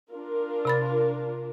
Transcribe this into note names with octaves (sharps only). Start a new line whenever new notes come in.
D4 F4 A#4
C3 B5 A6